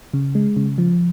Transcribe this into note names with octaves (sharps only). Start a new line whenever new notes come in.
C#3
G#3
C#3
F3